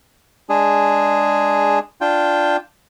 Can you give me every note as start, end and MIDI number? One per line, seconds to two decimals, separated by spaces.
0.49 1.79 56
0.49 1.79 62
0.49 1.79 68
2.01 2.57 62
2.01 2.57 65
2.01 2.57 79